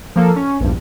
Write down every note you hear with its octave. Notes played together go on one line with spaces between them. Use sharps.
F3 A#3 A4
C#4
A#1 E2 G2